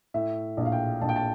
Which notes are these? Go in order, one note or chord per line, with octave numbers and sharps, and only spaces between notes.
A2 E5
A#1
F5
G5
A#1 A5
G5
A5